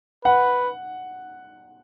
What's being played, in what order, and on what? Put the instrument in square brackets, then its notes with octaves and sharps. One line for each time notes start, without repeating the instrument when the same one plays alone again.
[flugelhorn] B4 [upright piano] F#5